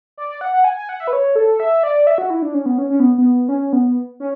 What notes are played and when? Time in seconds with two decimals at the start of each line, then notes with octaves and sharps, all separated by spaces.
0.18 D5
0.29 D5
0.41 F#5
0.54 F#5
0.64 G#5
0.76 G#5
0.89 F#5
1.00 E5
1.07 B4
1.13 C#5
1.36 A4
1.60 E5
1.83 D5
2.07 E5
2.18 F#4
2.30 E4
2.42 D4
2.54 C#4
2.66 B3
2.78 C#4
2.90 C#4
3.00 B3
3.18 B3
3.49 C#4
3.73 B3
4.20 C#4